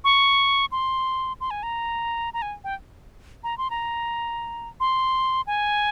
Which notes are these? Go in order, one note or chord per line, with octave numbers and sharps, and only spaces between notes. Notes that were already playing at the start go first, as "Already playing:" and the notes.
C#6
C6
C6
G#5
A#5
A#5
G#5
G5
A#5
C6
A#5
C6
G#5